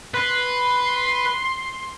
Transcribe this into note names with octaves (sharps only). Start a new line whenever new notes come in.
B4 C6